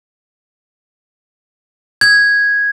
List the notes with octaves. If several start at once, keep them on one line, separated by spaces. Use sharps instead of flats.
G#6